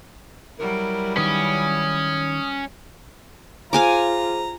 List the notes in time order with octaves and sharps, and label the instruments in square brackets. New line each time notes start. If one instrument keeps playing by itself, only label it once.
[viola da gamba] F#3 G3 E4 [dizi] A#4
[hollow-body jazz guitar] D#3 B4 [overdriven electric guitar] C#4 [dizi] D#6
[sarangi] F4 [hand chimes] G#4 C5 [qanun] F5 G#5 D6 [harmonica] A#5